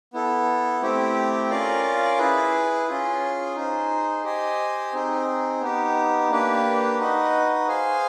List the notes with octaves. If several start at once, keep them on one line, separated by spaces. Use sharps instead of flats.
B3 E4 A4
A3 C4 E4 G4
C#4 F4 A#4 D5 F5
E4 G#4 B4
C#4 F4 G#4
D#4 G#4 C5
G4 C5 D#5 G#5
C4 D#4 G#4
B3 D#4 G4
A#3 D4 G4 B4
D#4 F#4 B4 D#5
G#4 C5 F5 G#5